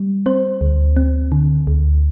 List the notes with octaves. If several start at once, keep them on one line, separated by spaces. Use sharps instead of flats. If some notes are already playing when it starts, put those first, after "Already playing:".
Already playing: G3
C4 C5
D2
C4
D3
D2